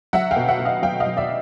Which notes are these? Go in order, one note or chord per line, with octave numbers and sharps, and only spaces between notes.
F#3 E5 F#5
F5 G5
B2
E5 F#5
B2
D#5 F5
F#3 F5 G5
D#5 F5
F#3
D5 E5